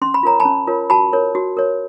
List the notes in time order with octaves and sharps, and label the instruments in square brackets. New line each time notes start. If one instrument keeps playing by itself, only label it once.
[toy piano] C#4 C6
B5
F4 A#4 C#5 A#5
A5 B5
C#4
F4 A#4 C#5
F#4 A5 B5
A#4 C#5
F#4
A#4 C#5